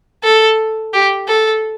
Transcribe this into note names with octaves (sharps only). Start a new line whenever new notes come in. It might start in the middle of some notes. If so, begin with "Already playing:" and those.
A4
G4
A4